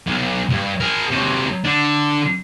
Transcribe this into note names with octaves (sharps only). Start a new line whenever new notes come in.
B1
C#2 G2
G#4 A#4
C3 F#3
D3 D4